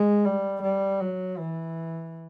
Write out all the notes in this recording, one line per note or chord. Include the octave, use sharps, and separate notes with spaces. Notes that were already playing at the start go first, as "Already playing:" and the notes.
Already playing: G#3
G3
G3
F#3
E3